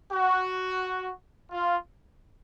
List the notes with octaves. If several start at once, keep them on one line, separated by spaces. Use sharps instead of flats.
F#4
F4